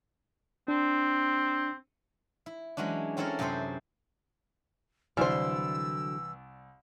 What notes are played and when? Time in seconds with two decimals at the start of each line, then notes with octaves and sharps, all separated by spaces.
0.68 C4 D4
2.46 E4
2.77 E3 F#3 G#3 C#4 D4
3.17 C4 C#4 E4 A4 A#4 C#5
3.39 F#2 C3 G#4 A4 C5
5.17 C2 D3 E3 F#3 C5 D5 E6 F6